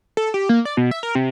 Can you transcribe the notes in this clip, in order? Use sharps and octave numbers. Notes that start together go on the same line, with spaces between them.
A4
G4
A#3
D5
B2
E5
A#4
C3